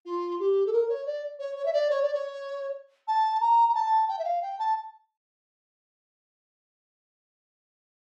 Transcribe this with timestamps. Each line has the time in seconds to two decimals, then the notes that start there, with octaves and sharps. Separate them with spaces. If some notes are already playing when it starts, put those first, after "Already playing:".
0.06 F4
0.40 G4
0.66 A4
0.73 A#4
0.89 C#5
1.06 D5
1.39 C#5
1.56 C#5
1.66 E5
1.73 D5
1.90 C#5
2.02 D5
2.14 C#5
3.08 A5
3.41 A#5
3.69 A#5
3.75 A5
4.08 G5
4.19 E5
4.24 F5
4.42 G5
4.59 A5